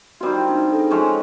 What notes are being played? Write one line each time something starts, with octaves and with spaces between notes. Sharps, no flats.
D#3 G3 C4 F4 F#4
E4
D4
D#4
A4
G#4
F3 G#3 C#4 A4